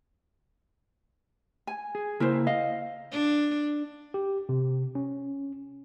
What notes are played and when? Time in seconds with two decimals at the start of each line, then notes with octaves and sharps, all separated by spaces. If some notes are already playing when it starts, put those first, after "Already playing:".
1.67 G#5
1.95 G#4
2.20 C#3 A#3 E4 A#4 C5
2.47 D#5 F5
3.12 D4
4.14 G4
4.49 C3
4.95 C#4